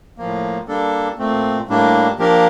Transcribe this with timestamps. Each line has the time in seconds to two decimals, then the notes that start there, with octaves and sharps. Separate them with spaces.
0.18 A2 F3 A#3
0.68 G3 A#3 D4 A4
1.18 A#2 A3 C4
1.68 A2 G3 A#3 D4
2.19 F3 A#3 D4 G4 A#4